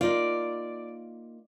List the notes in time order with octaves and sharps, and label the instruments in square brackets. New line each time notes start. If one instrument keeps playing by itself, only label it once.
[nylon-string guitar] A#3 D#4 F4 [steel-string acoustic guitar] D5